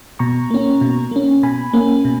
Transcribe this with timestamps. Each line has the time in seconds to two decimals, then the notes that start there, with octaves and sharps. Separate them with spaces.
0.19 B2 A#5 C#6
0.50 A#3 C#4
0.81 B2
1.11 A#3 C#4
1.43 B2 G#5 B5
1.73 A#3 C#4
2.05 B2